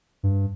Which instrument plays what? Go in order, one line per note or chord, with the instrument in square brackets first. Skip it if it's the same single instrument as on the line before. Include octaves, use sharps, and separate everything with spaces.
[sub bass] G2